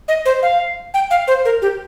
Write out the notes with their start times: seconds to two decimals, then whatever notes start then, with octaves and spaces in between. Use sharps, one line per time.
0.08 D#5
0.25 C5
0.43 F5
0.94 G5
1.11 F5
1.28 C5
1.45 A#4
1.62 G4